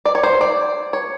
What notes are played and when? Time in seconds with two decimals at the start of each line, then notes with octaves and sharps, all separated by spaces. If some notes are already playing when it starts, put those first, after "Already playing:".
0.06 D5
0.15 C#5
0.23 C5
0.41 D5
0.93 C#5